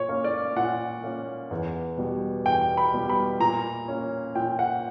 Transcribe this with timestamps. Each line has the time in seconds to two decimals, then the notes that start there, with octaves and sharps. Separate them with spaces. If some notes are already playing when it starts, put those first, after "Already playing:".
Already playing: A#2 C#5
0.08 A#3 C#4
0.24 D5
0.56 A#2 F#5
1.04 A#3 C#4
1.51 E2
1.98 B2 G3
2.46 E2 G5
2.77 B5
2.93 B2 G3
3.10 B5
3.40 A#2 A#5
3.88 A#3 C#4
4.35 A#2 G5
4.59 F#5